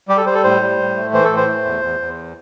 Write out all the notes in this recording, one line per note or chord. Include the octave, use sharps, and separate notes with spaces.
G3 G4
A4
G3 C5
A4
A2 C5
G3
A2
A3
E3 C5
A4
A2
C5
A3
E2
E2
E2